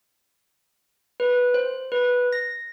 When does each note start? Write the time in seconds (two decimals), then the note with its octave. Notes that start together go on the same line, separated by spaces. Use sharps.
1.20 B4
1.54 C5
1.92 B4
2.32 A#6